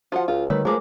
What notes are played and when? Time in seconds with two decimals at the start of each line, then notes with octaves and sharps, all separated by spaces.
0.12 F3 F4 F#4 C5 F#5 A5
0.28 C#2 F4
0.50 D3 D#3 G3 A3 B4 C#5 E6
0.65 F3 G#3 A3 G#4 A#4 B4 D6